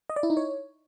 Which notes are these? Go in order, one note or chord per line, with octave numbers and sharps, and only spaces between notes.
D#5
D5
E4
D#4
C#5